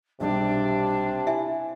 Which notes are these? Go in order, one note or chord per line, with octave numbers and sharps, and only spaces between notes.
B1 C3 G3 D4 G4
E4 E5 G#5